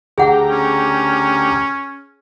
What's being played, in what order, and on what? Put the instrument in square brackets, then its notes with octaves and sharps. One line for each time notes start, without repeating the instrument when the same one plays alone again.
[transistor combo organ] D2 G4 A#5 [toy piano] G#4 F#5
[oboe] C#4